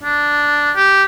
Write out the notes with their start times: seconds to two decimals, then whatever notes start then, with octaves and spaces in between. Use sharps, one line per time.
0.03 D4
0.76 G4